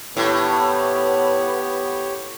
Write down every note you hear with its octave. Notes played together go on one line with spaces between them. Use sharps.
A2 B3 G4 C#5